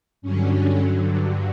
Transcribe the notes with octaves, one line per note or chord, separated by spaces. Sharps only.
G2 D3 F#3 C#4